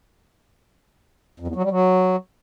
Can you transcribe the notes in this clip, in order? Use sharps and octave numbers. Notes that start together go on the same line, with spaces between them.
F2
E2
F#3
G3
F#3